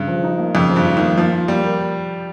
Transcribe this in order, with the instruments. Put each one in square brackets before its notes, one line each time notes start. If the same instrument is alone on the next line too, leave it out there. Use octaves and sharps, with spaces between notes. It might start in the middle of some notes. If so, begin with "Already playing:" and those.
Already playing: [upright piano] G2 [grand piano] C#3
[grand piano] F3
D#4
A#3
[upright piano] F2 [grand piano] C#3
[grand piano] F3
[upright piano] G2
[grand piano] D#4
[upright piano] D#3
[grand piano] A#3
[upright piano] F3 [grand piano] A#3
[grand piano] F4
[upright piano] G3 [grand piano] A#3
[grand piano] A#4